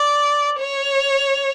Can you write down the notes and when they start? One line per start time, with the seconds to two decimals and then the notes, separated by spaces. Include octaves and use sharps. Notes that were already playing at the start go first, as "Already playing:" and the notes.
Already playing: D5
0.60 C#5